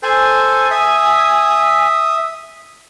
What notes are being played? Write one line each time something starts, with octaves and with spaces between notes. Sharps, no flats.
A4 C5 G#5
E5 D#6